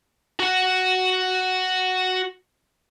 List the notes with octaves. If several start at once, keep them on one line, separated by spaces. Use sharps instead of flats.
F#4 F#5